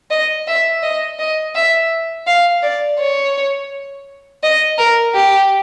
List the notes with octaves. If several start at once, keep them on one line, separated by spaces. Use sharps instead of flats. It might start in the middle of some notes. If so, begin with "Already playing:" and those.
D#5
E5
D#5
D#5
E5
F5
D5
C#5
D#5
A#4
G4